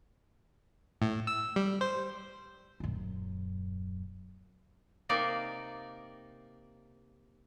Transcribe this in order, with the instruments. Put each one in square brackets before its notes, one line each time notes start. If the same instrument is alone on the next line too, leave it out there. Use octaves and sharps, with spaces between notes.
[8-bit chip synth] A2
E6
G3
C5
[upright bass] D#1 F#2
[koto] C3 A#3 D#4 D5 F5